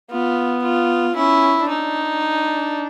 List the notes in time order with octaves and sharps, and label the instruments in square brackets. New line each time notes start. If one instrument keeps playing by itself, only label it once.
[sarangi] B3 [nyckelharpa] F4
[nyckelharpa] F4
[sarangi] C#4 [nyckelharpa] E4
[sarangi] D4 [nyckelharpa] D#4